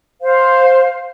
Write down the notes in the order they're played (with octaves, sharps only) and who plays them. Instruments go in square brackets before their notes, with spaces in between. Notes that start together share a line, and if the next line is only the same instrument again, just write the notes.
[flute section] C5 F5